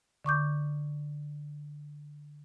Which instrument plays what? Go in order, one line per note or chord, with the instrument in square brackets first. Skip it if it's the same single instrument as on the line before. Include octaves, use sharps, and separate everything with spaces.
[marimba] D3 C#6 D6 G6